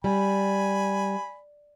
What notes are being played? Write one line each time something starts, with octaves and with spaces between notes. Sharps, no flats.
G3 G#5 B5